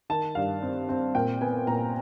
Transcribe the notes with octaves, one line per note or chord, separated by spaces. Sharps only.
D#3 A5
G2 F5
C4
C4
A#2 G5
B3 G#5
A#2 A#5